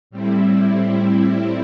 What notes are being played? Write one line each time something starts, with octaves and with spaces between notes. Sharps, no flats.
A2 G3 C4 E4